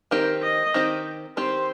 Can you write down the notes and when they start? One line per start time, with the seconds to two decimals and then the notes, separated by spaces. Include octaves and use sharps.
0.11 D#3 C4 G4 A#4
0.43 D#5
0.74 D#3 C4 G4
1.37 D#3 C4 G4 C5